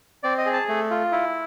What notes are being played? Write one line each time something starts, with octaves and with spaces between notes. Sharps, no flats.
C4 D5
D#5
G#4
A5
A3
F4
E4